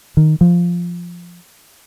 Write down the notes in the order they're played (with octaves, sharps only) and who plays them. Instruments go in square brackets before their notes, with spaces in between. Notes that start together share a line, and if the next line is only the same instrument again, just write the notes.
[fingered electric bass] D#3
F3